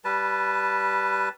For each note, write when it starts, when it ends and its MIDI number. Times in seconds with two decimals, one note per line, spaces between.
0.04 1.29 55
0.04 1.29 71
0.04 1.29 81